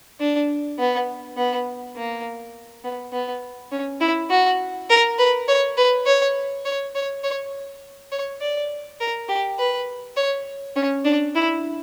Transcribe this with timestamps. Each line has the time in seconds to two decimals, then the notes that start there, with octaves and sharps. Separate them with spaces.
0.20 D4
0.79 B3
1.37 B3
1.96 A#3
2.84 B3
3.12 B3
3.72 C#4
4.01 E4
4.30 F#4
4.89 A#4
5.18 B4
5.48 C#5
5.77 B4
6.06 C#5
6.65 C#5
6.95 C#5
7.23 C#5
8.12 C#5
8.41 D5
9.00 A#4
9.29 G4
9.58 B4
10.17 C#5
10.76 C#4
11.05 D4
11.35 E4